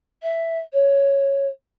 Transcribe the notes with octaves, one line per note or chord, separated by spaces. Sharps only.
E5
C#5